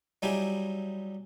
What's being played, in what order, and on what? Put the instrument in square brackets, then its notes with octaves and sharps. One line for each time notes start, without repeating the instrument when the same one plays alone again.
[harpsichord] F#3 G3 D#4 E4 G4 G#4